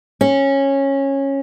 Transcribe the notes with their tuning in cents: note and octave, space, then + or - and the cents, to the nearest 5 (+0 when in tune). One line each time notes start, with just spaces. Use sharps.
C#4 -15